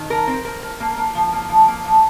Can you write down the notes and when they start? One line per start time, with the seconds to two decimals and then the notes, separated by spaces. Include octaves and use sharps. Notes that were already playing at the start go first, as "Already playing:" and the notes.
Already playing: D#3
0.10 A#4
0.27 C4
0.45 A#4
0.63 A#4
0.80 A#3
0.97 A#3
1.15 F3
1.32 A#3
1.49 F3
1.68 A#3
1.85 F3